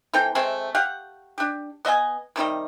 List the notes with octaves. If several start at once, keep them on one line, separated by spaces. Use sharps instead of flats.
E3 C4 A4 G5
C3 G#3 A3 C4
G4 F5 F#5
D4 G4
B3 D#5 E5 G#5
C3 D#3 G3 D#5